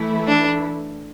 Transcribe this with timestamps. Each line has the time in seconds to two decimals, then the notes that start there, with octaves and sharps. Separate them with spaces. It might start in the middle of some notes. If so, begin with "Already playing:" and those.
Already playing: E3 A3 E4
0.28 D4